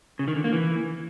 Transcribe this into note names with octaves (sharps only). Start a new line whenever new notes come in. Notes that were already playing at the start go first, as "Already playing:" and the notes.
C#3
D#3
D3
A#3
E3